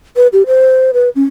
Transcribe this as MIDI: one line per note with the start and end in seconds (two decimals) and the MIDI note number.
0.16 0.27 71
0.33 0.43 67
0.47 0.91 72
0.94 1.09 71
1.16 1.23 61